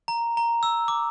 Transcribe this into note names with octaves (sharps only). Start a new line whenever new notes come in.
A#5
A#5
E6
D6